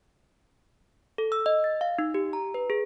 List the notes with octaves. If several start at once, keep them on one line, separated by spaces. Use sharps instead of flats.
A4
E6
D#5
A6
F5
D#4
G4
A#5
B4
G#4